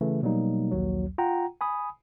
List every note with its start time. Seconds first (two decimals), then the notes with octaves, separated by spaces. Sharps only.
0.01 C#3 E3 A3
0.22 B2 F#3 G3 A#3 D#4
0.71 A#1 D#2 F#3
1.18 F4 F#5 G5 A#5
1.61 G#5 B5 D#6